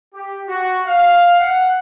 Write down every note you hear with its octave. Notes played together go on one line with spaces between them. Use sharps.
G4
F#4
F5
F#5